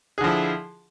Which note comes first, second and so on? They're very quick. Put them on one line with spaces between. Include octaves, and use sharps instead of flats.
G#4 D3 F3 E4